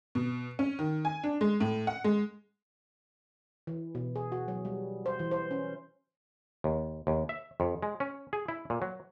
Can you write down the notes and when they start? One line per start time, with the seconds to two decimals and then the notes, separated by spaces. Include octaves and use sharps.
0.15 B2
0.59 C#4
0.79 D#3
1.05 G#5
1.23 D4
1.41 G#3
1.60 A2
1.87 F#5
2.04 G#3
3.67 E3
3.95 B2
4.16 G#4
4.32 F#4
4.48 F#3
4.65 G3
5.06 C5
5.19 E3
5.31 C5
5.51 C#4
6.64 D#2
7.07 D#2
7.29 E5
7.60 F2
7.83 G#3
8.00 C#4
8.33 G#4
8.48 E4
8.70 A#2
8.82 F#3